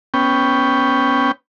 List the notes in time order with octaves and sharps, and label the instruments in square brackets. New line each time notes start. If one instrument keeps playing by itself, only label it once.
[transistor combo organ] B3 C#4 G5